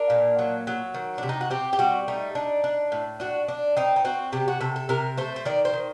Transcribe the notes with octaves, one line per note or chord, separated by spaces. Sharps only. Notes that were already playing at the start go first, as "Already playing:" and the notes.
Already playing: D4 A#4
A#2
F#3
F#3
D#3
C3 D4
D#4
F#4
C4 G4
G4
G3 F#4
A3 D#4
D4
D4
A2
D4 F#4
D4
C4 D#4
D#4
C4 F#4
C3 G4
F#4
C3 A4
A4
C3 A#4
A3 C5
C5
D#3 D5
C5
D#3